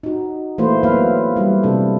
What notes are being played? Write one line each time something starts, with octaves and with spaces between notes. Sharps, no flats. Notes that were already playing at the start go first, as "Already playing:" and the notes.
D#4 F#4
E3 A3 A#3 E4 B4 C5
F#3 A#3 B3 B4 F5
G3 E4 G4
C3 D4 A4